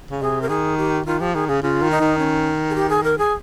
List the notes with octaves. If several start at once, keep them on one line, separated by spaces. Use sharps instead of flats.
C#3
C3 G#4
A#4
D#3 G#4
G4
D#3 F4
F3 G4
D#3 G#4
C#3 G#4
C#3 F4
D#3
D#4
D#3
C#4
G#4
G4
G#4
A#4
G#4